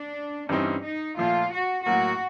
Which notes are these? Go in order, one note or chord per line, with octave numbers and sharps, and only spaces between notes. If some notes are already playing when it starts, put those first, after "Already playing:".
Already playing: D4
G2 E3 G3 C4 C#4 D#4
D#4
A#2 F3 A3 F4
F#4
A2 F#3 A#3 F#4